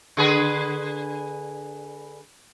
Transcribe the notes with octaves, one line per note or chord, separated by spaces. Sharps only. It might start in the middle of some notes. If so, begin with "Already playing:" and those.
D3 G#4 B4